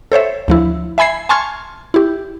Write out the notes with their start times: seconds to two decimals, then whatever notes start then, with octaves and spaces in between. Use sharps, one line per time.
0.12 A4 C5 C#5 E5
0.48 D2 F3 E4
0.98 E5 G#5 B5 G#6 C7
1.29 G#5 A5 C6 C#6 F6 G#6
1.94 E4 G4